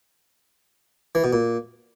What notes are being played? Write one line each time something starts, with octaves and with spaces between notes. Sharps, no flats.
E3
B2
A#2